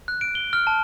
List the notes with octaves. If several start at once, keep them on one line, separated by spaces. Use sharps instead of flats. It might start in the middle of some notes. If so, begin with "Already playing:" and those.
F#6
D7
G7
F6
A5